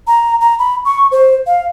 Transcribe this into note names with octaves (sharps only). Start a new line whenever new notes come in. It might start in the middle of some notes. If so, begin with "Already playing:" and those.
A#5
A#5
B5
C#6
C5
F5